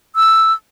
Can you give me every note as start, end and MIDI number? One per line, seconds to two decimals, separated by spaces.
0.16 0.52 88